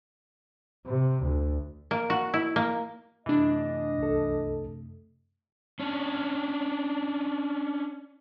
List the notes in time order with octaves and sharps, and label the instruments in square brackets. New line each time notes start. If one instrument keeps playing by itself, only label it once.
[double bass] C3
D2
[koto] A#3
F#4
E4
A#3
[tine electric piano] F#2 C3 A3 [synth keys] E3 D4 [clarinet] D#5
[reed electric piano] C2 A4
[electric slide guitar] C#4 D4